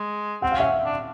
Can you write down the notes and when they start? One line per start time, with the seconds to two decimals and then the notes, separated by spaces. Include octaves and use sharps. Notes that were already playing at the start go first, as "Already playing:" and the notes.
Already playing: G#3
0.42 C4 F#5
0.51 F5
0.57 C#4 E5 F#5
0.85 D4